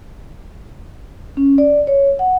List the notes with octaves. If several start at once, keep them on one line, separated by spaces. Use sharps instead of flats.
C#4
D5
C#5
F#5